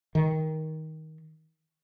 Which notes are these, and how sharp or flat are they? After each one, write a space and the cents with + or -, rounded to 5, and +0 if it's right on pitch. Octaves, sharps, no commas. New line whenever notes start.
D#3 +15